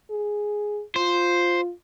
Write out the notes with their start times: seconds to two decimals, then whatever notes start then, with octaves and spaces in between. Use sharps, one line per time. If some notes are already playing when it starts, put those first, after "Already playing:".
0.11 G#4
0.96 F4 C5